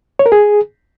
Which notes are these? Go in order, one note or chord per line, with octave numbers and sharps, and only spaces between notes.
C#5
A#4
G#4